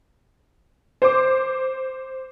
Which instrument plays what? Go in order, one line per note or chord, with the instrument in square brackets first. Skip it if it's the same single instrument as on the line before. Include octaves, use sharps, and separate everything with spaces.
[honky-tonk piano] C5 D6